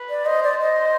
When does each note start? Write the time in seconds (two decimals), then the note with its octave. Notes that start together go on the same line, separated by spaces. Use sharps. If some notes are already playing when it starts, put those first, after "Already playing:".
Already playing: B4
0.09 D5
0.26 C5 D#5
0.43 D5
0.59 C5 D#5